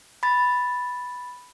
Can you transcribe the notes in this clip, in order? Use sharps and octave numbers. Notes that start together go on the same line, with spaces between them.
B5 A6